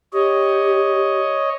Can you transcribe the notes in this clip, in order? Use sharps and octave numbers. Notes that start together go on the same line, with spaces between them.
G4 C#5 D#5